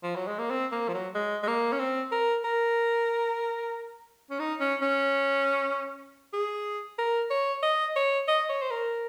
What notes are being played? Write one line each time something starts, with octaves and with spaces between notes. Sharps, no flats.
F3
F#3
G#3
A#3
C4
A#3
F3
F#3
G#3
G#3
A#3
C#4
C4
A#4
A#4
C#4
D#4
C#4
C#4
G#4
A#4
C#5
D#5
C#5
D#5
C#5
C5
A#4